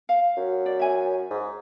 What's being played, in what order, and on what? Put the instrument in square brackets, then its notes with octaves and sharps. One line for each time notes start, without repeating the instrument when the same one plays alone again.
[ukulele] F5
[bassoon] F#2
[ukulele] D5
E5 G#5
[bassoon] G#2